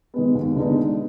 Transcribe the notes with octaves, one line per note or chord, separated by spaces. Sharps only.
D#3 G#3 B3
D#2
D3 G#3 B3 D#4